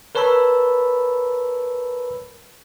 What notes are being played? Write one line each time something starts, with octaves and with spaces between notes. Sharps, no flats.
A#4 B4 C#5 A5 B5 E6